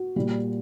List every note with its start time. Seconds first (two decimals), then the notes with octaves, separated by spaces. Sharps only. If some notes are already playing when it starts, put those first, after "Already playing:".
Already playing: F#4
0.16 A#2 G3